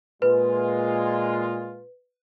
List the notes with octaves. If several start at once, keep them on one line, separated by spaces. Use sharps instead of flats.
A#2 G#3 F4 B4